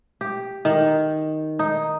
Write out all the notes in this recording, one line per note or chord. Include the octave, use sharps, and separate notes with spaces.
G4
D#3
D#4